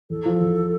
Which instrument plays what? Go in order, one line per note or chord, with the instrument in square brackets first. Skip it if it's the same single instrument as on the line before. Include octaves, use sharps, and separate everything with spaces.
[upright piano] E2 [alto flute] A4
[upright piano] F3
E2